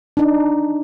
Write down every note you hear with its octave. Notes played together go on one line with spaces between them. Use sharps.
D4 D#4